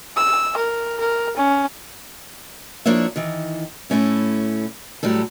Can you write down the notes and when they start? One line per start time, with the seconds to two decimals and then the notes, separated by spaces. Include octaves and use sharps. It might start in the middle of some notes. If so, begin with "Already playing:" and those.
0.16 E6
0.57 A#4
1.00 A#4
1.37 C#4
2.86 F3 A#3 D4 E4 C#5 E5
3.16 D#3 E3
3.90 A2 A3 C#4 E4
5.03 A2 F#3 G3 A4